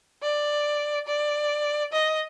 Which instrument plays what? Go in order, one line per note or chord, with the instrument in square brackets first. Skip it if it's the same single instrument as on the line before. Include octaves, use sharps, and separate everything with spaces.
[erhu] D5
D5
D#5